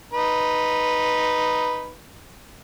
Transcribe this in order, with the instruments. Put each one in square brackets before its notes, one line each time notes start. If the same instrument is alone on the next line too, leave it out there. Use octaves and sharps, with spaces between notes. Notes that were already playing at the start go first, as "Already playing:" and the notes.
[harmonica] D#4 B4